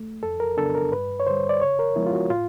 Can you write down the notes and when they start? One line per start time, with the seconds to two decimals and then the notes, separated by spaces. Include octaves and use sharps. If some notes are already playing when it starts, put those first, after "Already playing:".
Already playing: A3
0.23 F2 A4
0.40 A#4
0.57 C#3 F#3 B3 D4 A4
0.75 A#4
0.92 G2 B4
1.20 C#5
1.26 D3 G3 C5
1.49 D5
1.61 C#3 C#5
1.79 A#4
1.96 F3 G#3 B3 E4
2.06 F4
2.13 F#4
2.30 A2 F4